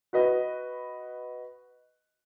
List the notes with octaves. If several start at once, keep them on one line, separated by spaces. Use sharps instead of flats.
F#4 B4 D#5